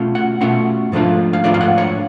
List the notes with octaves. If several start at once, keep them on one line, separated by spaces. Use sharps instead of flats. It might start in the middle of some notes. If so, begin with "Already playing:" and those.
Already playing: B2 A3 C#4 F4
F#5
B2 A3 C#4 F4 F#5
G#2 F3 A3 D4 F4
F5
G#2 F3 A3 D4 F4 D5
F5
F#5
C#5